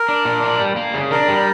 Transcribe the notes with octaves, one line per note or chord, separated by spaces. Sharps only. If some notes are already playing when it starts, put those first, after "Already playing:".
Already playing: A#4
D4
A#2
D4
G3
A#3
C#3
D4 A#4
G3